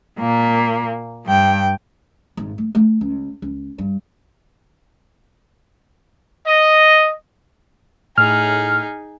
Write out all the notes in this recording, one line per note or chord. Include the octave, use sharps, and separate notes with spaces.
A#2 A#3
G2 G5
G#1
A3
A3
C#2
C#2
G2
D#5
A2 D#4 G#4 F6